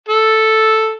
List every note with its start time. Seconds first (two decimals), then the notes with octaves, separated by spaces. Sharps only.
0.09 A4